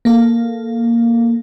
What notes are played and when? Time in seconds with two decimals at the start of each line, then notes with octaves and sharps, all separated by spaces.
0.05 A#3 A4 F5